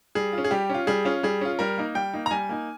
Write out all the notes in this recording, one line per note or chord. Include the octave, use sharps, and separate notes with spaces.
G3 G#4
F4
C#4
G#4
G3 G4
C#4 F4
G3 G#4
C#4 F4
G3 G#4
C#4 F4
G3 A#4
A#3 D#4
G3 G5
A#3 D#4
A#5
G3 G#5
A#3 D#4